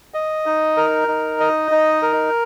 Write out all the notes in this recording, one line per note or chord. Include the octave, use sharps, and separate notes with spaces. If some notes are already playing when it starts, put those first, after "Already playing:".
D#5
D#4
A#4
D#4
D#5
D#4
A#4